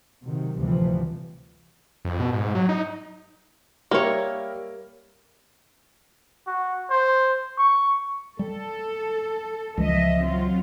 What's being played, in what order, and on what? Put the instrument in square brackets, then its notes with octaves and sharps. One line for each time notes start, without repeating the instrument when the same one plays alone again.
[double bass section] C3 D#3 F#3
D2 A2 C3 E3 F3 G3
[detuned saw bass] F2
B2
G#2
F#3
D#4
[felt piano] G3 A#4 E5 [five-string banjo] A#3 C#5
[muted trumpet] F#4
C5
C#6
[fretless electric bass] G3 [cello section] A4
[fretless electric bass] C#2 E3 G3 [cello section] F3 D#5 E5
[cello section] F#3 C4 F4